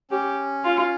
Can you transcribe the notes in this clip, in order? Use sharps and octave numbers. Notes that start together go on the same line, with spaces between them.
C#4 G4
F4